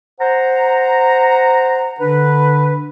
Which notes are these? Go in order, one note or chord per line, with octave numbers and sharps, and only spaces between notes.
C5 F#5 A#5
D3 D4 B4